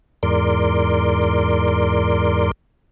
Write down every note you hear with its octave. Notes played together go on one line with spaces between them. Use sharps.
E2 G#2 A#4 D5 C6